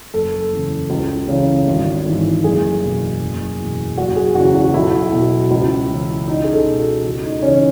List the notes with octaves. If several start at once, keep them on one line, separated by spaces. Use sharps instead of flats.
F#1 A4
E2 C#3
C#2
C#3 E3
G#1
G#2 E3
F#1 G#4
E2 B2
F#1
E2 B2
F#1 F#4
G#4
E2 C#3 E3 F#4
F#4
B1 E4
B2
C#2
C#3 E3
C#2 D#4
G#4
A4
B2
F#4
C#2
D#4
C#3 E3 C#4